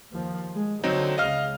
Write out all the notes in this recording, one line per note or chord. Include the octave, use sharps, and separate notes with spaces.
D#2 F3
G#3
D3 F#3 C4 D#4
C#2 C#3 D#5 F5 F6